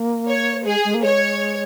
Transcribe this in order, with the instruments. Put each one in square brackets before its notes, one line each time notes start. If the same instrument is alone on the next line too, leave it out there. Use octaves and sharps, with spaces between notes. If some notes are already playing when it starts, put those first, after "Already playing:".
Already playing: [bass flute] A#3
[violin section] C#5
[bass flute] G#3 [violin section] G#4
[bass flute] G#3
A#3
[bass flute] G#3 [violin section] C#5